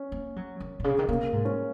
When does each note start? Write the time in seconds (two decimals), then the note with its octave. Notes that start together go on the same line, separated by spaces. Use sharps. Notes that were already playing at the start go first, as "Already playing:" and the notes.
Already playing: C#4
0.12 A#3
0.36 F#3
0.60 D#3
0.80 A#2
0.84 C#3
0.99 D#3
1.09 C#3 A#3
1.33 G#2
1.45 C#4